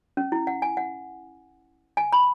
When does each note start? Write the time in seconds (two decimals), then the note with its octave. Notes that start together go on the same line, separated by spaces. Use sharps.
0.17 C#4
0.32 E4
0.47 F#5
0.62 G#5
0.77 F#5
1.97 G#5
2.12 B5